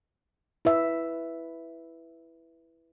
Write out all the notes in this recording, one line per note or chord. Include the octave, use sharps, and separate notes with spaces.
E4 B4 E5